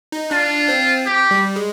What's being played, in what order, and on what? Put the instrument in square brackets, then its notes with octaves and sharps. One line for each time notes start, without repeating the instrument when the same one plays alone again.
[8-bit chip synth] D#4
[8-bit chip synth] D4 [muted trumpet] F4
[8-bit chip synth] C4
[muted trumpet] G4
[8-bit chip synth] G3
G#3